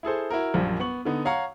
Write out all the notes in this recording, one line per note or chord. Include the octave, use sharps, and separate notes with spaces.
E4 G#4 A4 C5
E4 F#4 A#4
A#1 F#2 F3 G3
B3 C#6 F#7
D3 B3 D#4
C#5 F5 F#5 A#5 C#6